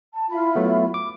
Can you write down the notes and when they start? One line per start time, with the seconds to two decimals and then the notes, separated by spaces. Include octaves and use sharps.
0.13 A5
0.28 E4 F4 B5
0.55 F#3 A3 B3
0.94 D6